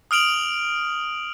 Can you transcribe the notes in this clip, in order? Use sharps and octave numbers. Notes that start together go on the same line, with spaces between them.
D#6 F6 D7 F7 F#7